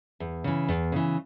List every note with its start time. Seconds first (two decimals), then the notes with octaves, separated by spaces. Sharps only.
0.20 E2
0.44 C#3 E3
0.68 E2
0.92 C#3 E3